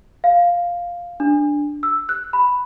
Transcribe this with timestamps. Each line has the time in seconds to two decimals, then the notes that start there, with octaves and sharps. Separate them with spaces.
0.24 F5
1.20 D4
1.83 E6
2.09 F#6
2.33 B5